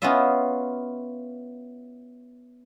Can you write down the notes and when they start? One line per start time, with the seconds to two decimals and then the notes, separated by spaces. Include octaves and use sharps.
0.02 B3 C#4 E4 F4 D#5 E5